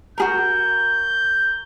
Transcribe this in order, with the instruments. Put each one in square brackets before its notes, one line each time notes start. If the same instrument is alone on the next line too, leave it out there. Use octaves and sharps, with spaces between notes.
[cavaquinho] F#4 G#4 A#4 [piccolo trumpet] G6